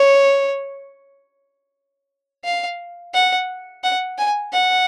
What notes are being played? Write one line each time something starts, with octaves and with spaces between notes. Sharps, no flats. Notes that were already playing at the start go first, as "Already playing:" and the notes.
Already playing: C#5
F5
F#5
F#5
G#5
F#5